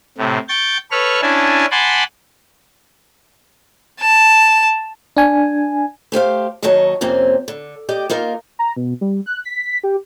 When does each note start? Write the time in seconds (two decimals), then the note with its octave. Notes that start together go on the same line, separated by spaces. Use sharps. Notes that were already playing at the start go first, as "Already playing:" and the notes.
0.18 A2 C3
0.49 G5 C#6 G6 A6
0.91 A4 B4 C#5 C#6 F6
1.22 C#4 D4 E4 G#5 A5
1.71 F#5 G#5 A5 B5 C6 D6
4.01 A5
5.17 D4 G#5
6.12 A3 G4 C5 F5
6.62 D#2 D#3 F#3 C#5 D#5 A5
7.01 F2 C3 A#3 C4 C#4
7.48 D3
7.89 G4 D5 D#5
8.10 A#3 D#4 F4 A#4
8.59 A#5
8.76 B2
9.01 G3
9.26 F#6
9.45 B6
9.83 G4